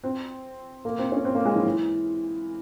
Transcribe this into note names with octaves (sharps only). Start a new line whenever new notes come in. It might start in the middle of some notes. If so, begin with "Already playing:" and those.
C4
A#3
C4
C#4
C4
A#3
G#3
E3
E3